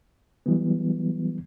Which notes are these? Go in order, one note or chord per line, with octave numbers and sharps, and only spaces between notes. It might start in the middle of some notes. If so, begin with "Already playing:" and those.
E3 F#3 G3 B3